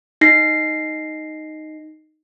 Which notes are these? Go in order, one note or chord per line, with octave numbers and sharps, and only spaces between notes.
D#4 A#6 C7